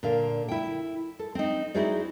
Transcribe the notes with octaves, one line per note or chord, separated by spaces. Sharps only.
A#2 D3 F5
E4 G5
A4
C4 D#4
D#4 E4 F#4 G#4 C5 D5